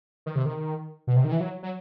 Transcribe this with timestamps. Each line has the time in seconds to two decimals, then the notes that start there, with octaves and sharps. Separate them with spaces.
0.26 D#3
0.35 C3
0.46 D#3
1.07 B2
1.16 C3
1.24 D#3
1.32 E3
1.41 F#3
1.63 F#3